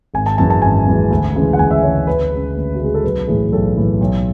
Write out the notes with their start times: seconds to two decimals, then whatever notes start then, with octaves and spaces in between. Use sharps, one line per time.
0.14 G#1 G#5
0.26 A5
0.38 F#2 E3 G#3 A5
0.50 A5
0.62 G#1 G#5
0.87 F#2 E3 G#3
1.10 D2
1.35 C#3 E3 G#3
1.53 F#5
1.59 D2 G#5
1.71 E5
1.83 C#3 E3 G#3 C#5
2.07 D2 B4
2.31 C#3 G#3
2.56 D2
2.75 F#4
2.80 C#3 G#3 G#4
2.94 A4
3.04 B1 B4
3.27 A2 E3 G#4
3.52 B1 A4
3.76 A2 E3
4.00 B1